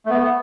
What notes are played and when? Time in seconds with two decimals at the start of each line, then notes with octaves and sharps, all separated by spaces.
0.06 A3
0.10 B3